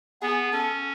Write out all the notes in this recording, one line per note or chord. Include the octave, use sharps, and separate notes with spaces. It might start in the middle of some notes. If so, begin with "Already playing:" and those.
B3 G#4
C#4 A4